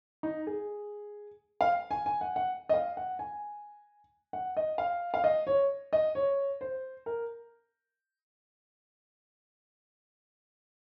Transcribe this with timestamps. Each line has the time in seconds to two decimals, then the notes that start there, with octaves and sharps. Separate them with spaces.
0.23 D#4
0.47 G#4
1.61 F5
1.91 G#5
2.06 G#5
2.21 F#5
2.36 F#5
2.69 D#5
2.74 F5
2.97 F#5
3.19 G#5
4.33 F#5
4.57 D#5
4.78 F5
5.14 F5
5.24 D#5
5.47 C#5
5.93 D#5
6.15 C#5
6.61 C5
7.06 A#4